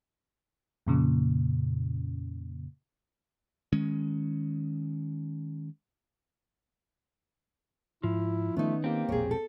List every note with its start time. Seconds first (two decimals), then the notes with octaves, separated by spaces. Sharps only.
0.87 F2 A#2 C#3
3.73 D#3 G#3 C#4
8.03 G#2 F3 E4
8.57 D#3 A3 B3 C#4 D#4
8.84 A#3 C4 G4
9.09 E1 A#1 G#4 C#5
9.31 A4